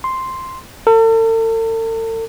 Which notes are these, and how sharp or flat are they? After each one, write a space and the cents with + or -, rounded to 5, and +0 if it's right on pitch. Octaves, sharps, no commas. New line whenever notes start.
C6 +0
A4 +45